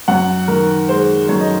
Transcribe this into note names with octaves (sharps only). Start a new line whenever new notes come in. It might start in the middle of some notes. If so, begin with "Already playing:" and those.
F#2 F#5
D#3 A#4
G#3 C5
F#2 C#5
D#5